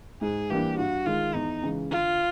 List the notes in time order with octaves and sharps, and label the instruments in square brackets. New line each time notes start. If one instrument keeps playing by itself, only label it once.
[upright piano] G#2 [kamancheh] G#4
[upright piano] E3 G3 A#3 D4 [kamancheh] G4
[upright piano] G2 [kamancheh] F#4
[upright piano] D#3 G#3 [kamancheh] F4
[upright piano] E2 [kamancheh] D#4
[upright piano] C#3 E3 G#3
[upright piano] D3 [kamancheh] F4